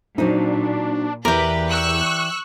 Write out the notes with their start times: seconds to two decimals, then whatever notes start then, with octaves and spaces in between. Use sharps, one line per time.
0.18 A#2 F#3 C4 D4 D#4
1.25 E2 E3 G4 A#4 B4 D5
1.70 C#6 E6 F#6